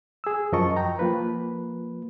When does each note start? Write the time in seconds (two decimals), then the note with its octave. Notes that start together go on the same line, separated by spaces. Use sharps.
0.24 G#4 E6
0.52 F#2 F3 A#4 D#5 A5 C#6
0.76 G5 A#5
0.99 F3 A#3 F4 B4